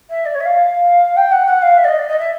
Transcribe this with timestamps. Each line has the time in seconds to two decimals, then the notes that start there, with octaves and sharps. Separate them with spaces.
0.09 E5
0.25 D5
0.34 C#5
0.40 E5
0.45 F5
1.16 G5
1.31 F#5
1.46 F#5
1.62 F5
1.77 E5
1.84 D5
1.88 D#5
1.98 D5
2.08 D#5
2.18 E5